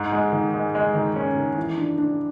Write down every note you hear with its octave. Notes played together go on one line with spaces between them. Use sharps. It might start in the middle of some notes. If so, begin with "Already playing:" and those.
Already playing: G#2
G#3
D#3
G#3
G#3
D#3
C#4
D#3
E3
D4
D4